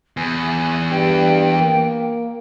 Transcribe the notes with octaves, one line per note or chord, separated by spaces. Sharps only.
E2 G#5
G2 G5
A#3